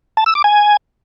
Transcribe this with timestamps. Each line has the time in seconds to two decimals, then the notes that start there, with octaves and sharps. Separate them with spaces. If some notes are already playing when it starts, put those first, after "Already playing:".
0.17 A5
0.26 E6
0.35 D6
0.44 G#5